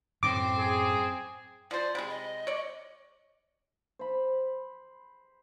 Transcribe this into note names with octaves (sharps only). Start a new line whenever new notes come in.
F#2 A2 C4 D6
G#4
F3 C5 D5
C3 G#3 B5
D#5
C#5 D5
C5 B5